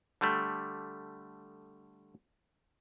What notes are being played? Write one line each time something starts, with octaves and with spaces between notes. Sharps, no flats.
D3 G3 A3